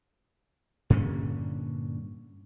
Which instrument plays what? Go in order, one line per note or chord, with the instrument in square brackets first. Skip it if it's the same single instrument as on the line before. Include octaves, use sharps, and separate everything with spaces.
[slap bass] G2 A#2 D3 C#4